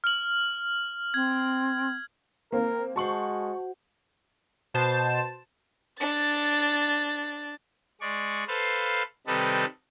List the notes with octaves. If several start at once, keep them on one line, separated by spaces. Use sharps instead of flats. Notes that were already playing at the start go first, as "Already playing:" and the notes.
F6 F#7
C4 G#6
A#3 C4 A#4
G#3 F#4 C5 A5 C#6 F#7
B2 C5 A5 E7
D4 A6
G#3 D5 C#6
A4 B4 C5 F5
C3 D#3 G3 D#4 A4 B4